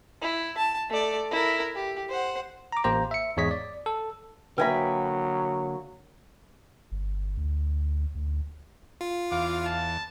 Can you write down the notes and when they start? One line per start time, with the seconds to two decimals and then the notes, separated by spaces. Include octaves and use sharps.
0.22 E4
0.58 A5
0.90 A3 D5
1.31 E4 A#4
1.75 G4
2.09 C5 F#5
2.72 A#5 D6
2.84 A1 A#3 G4 C5 A#5
3.11 E5 C#7
3.37 E2 G#2 G#3 C#5 D#5 B6
3.51 D5
3.86 A4
4.58 D3 F#3 A#3 B4 E5 G5 G#5 B5
6.92 G1
7.37 D2
8.15 D2
9.01 F4
9.31 E2 F5 D6
9.65 A5